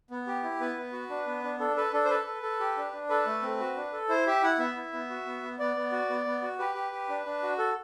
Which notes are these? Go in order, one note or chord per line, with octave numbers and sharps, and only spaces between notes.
B3
G4
E4
B3 B4
B3
F#4
D4
B3
D4
D4 A4
A4 B4
D4 A4
C5
A4 B4
A4
A4
G4
D4
D4
A4 B4
A3
C4
F#4
D4
A4
E4 C5
G4 E5
E4 F#5
B3 E5
E4
B3
F#4
B3
B3
B3 D5
B3
F#4
B3
B3
F#4
G4 B4
G4
G4
D4
D4
F#4
A4